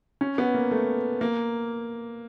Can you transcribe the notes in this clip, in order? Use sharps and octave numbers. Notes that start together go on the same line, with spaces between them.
C#4
B3
A#3
A3
A#3